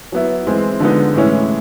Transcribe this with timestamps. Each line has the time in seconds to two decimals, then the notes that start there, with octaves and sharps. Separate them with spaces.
0.12 F#3 B3 E4
0.47 E3 G#3 C4
0.80 D3 F3 G#3 B3 D#4
1.14 A2 E3 G#3 C#4 E4